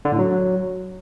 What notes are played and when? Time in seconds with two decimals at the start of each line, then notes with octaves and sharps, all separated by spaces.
0.05 D3
0.12 A2
0.19 F#3